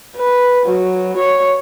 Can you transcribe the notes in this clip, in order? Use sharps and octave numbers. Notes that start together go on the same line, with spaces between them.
B4
F#3
C#5